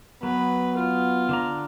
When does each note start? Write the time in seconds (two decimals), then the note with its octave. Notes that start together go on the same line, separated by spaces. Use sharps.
0.23 F#3 B3 B4
0.78 F4
1.29 D3 D4 A#5